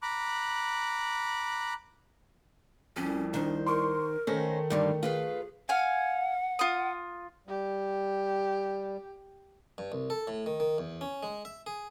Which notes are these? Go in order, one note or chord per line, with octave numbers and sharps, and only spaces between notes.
A#5 B5 D6 F#6
C2 F2 C#4
D#3 D4 C5
A#4 C6 C#6
D#3 A3 C#4 D#4 C5 A#6
G2 D3 G3 D#4
F4 G#4 B4 F5
F5 F#5 G#5
F4 D#6
G3 G4
G2
C2
A4
A2
D#3
D#3
E2
C#4
G#3
E5
G#4